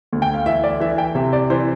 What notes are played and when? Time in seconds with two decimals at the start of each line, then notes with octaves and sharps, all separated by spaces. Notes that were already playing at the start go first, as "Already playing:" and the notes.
0.13 D2
0.22 G5
0.34 F5
0.46 E3 E5
0.64 D5
0.80 E3 E5
0.98 G5
1.15 C3 E5
1.33 D5
1.50 E3 C5